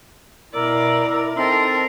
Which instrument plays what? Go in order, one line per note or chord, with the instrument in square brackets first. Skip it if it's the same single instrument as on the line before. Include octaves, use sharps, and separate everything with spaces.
[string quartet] B2 D5 [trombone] E4 [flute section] A#4 E6
[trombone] C4 [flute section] D#4 A4 [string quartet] A#4 C6